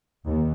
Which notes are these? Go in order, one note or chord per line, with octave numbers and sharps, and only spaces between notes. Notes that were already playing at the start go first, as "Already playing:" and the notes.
D#2